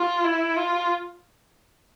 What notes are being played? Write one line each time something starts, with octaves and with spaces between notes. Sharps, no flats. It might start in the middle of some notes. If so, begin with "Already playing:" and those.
Already playing: F4
E4
F4